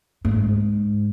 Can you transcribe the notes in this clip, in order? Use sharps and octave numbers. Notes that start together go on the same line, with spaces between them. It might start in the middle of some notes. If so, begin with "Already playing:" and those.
G#2